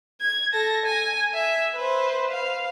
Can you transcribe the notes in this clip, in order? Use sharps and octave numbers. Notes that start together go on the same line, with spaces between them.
G#6
A4 A#6
G#5
E5
B4 C5
F5